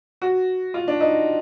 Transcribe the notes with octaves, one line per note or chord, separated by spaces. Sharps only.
F#4
F4
D4
D#4